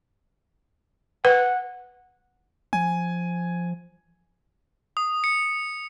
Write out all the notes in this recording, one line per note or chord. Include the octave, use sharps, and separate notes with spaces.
B4 F#5
F3 G#5
D#6
C#7